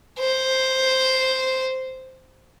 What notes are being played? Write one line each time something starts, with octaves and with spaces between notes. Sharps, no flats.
C5